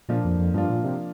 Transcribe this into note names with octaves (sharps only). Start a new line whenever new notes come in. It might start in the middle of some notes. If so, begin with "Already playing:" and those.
A#2 F3 A#3 D4 F4
F2
F2
G2 F3 A#3 D4 F4
A#2
C3